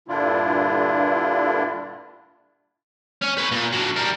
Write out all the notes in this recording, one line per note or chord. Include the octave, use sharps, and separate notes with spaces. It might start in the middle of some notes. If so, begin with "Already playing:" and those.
G2 A#2 D3 D4 E4 F4
C#4 C#5
B4 C#5
A#2
F#3 D4
G3 A#4